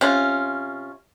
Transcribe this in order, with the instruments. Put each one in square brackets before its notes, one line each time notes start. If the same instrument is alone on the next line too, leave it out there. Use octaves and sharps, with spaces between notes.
[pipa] C3 C#4 F4